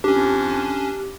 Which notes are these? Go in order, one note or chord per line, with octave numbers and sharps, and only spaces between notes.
F2 C#4 D4 G4